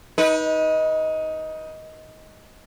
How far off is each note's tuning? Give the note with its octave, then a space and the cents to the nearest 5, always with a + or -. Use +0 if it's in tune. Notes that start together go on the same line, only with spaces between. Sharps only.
D#4 +15 B4 -25